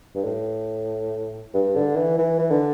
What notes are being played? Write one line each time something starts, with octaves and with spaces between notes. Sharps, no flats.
G2
A2
G2
D3
E3
E3
E3
D3